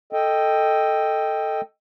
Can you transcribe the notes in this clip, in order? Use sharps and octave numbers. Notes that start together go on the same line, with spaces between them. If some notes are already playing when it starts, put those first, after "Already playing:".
A4 D#5 G5